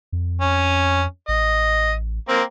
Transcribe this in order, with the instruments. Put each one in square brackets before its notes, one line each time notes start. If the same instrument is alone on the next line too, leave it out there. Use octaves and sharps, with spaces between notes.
[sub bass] F2
[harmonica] C#4
[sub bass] A1 [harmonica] D#5
[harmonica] A#3 C4